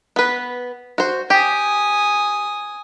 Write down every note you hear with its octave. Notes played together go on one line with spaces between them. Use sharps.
B3 B4
F#4 C5
G4 G#5 D#6